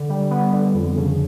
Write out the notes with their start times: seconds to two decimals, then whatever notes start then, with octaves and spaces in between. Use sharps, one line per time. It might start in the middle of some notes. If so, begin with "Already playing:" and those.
Already playing: D3
0.09 G3
0.30 B3
0.53 D3
0.74 F2
0.96 C#3